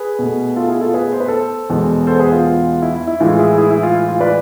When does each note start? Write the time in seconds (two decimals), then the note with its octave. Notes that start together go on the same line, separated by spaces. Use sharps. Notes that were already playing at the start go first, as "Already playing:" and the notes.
Already playing: G#4 B4
0.19 B2 A3
0.56 F4 A4
0.69 E4 G#4
0.81 F4 A4
0.94 G#4 B4
1.13 C5
1.20 B4
1.28 A4 C5
1.70 E2 B2 G#3
2.07 A4 C5
2.20 G#4 B4
2.32 F4
2.82 E4
2.95 E4
3.07 E4
3.20 A2 E3 G#3 F4
3.39 E4 G#4
3.58 E4 G#4
3.70 E4
3.83 F4
4.08 F4
4.21 B4 D5